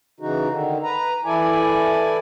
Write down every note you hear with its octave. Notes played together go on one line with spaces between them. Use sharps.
C#3 E3 D#4 F#4
D3 D#3
B4 A#5
E3 E4 A4 D5 G#5